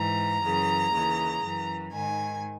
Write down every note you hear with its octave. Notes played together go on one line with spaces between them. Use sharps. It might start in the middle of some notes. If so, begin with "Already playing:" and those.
Already playing: G#2 E3 A#5
F#2 C#3 E3
D#2 C#3 E3
F#2 E3
G#2 D#3 G#5